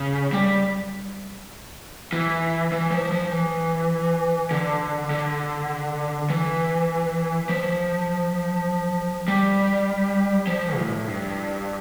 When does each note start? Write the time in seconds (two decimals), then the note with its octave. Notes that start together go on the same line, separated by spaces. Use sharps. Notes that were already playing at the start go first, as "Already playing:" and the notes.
Already playing: C#3
0.33 G3
2.13 E3
2.72 E3
2.91 F3
3.12 F3
3.31 E3
4.51 D3
5.11 D3
6.30 E3
7.49 F3
9.28 G3
10.47 F3
10.77 A2
11.07 G2